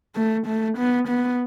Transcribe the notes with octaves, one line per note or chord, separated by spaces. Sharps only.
A3
A3
B3
B3